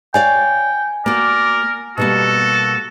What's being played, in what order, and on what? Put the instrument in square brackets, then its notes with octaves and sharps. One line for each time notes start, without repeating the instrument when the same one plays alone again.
[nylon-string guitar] C#5 D5 F5 [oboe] G5 [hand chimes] G#5
[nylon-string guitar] A#3 F#4 [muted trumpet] A#4 [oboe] D5
[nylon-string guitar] B2 G3 A#3 [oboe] F#4 [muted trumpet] A4